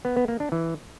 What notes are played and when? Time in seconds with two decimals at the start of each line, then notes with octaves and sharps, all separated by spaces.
0.05 B3
0.17 B3
0.28 A#3
0.40 D4
0.52 E3